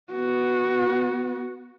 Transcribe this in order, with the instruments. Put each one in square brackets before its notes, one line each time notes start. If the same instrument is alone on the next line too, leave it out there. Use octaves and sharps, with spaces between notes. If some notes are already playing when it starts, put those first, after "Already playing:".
[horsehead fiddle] B3 F#4